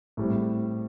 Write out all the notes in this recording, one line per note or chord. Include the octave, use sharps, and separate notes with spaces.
A2 G3 C4